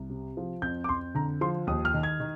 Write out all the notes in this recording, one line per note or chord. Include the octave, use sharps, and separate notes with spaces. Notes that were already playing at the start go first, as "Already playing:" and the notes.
Already playing: C2
C3
F3
F2 G6
D6
F2 C6
D3 A#5
F3 C6
D#2 D#6
F6
D#3
G#6
D#3